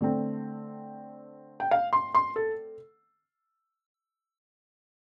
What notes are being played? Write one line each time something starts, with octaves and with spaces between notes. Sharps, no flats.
D3 A3 C4
G5
F5
C6
C6
A4